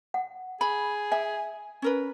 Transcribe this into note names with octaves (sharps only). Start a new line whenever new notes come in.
F#5
G#4 B5
E5 G#5
C#4 A#4 B4